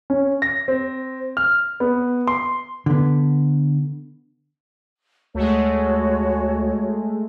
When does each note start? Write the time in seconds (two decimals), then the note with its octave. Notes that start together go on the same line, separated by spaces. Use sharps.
0.10 C#4
0.42 A#6
0.68 C4
1.37 F6
1.80 B3
2.27 C6
2.86 D3 B3
5.35 D2 G#3 A3 F#4 C#5